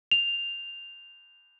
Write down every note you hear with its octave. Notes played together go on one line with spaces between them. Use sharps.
F7